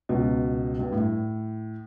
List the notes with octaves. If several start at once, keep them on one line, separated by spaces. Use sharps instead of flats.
C#2 B2
G2
A2